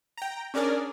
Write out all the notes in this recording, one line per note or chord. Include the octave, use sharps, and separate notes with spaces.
G5 A#5
C#4 D4 G#4 A#4 D5